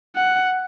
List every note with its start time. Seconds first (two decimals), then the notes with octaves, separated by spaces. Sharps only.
0.16 F#5